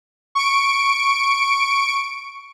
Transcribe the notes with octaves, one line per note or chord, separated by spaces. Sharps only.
C#6 D7